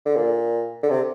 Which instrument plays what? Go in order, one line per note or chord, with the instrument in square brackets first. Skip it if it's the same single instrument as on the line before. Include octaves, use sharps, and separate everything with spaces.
[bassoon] D3
A#2
D3
C3